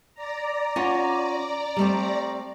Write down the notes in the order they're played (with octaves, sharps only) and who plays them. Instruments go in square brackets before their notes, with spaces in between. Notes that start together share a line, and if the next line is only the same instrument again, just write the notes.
[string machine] D5 A#5
[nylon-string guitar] C#4 F4 F#5
G3 A3 C4